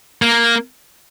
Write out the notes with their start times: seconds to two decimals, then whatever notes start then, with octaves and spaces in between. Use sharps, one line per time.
0.22 A#3